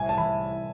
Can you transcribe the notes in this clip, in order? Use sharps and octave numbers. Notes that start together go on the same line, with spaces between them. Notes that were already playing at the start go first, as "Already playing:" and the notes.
Already playing: C2 A2 G#5
A5
E3 B5